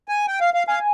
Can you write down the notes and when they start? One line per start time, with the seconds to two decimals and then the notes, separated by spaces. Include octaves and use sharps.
0.08 G#5
0.28 G5
0.41 F5
0.54 F5
0.67 F5 G#5